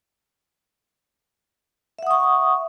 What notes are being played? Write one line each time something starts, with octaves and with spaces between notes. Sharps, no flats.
E5 F#5 C#6 D#6